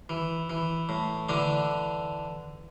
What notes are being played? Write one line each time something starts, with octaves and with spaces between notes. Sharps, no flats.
E3
E3
A2
D3 E3 D4